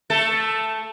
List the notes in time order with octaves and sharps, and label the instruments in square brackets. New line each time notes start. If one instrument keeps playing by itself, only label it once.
[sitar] A3 A4